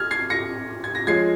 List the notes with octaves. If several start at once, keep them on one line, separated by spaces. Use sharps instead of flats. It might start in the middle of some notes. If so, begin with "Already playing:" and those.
Already playing: F6 G#6
G#6 C7
A#6 C#7
G#6
A#6
F3 G#3 C#4 G#6 C7